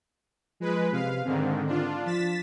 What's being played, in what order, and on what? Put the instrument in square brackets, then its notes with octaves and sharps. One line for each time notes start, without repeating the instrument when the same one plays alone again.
[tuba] F3 [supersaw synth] G#3 B4
[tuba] C3 [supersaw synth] F5
[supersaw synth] G#2 D3 D#3 [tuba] C4
[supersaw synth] D4 F4
[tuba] F3 [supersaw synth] A6 B6 E7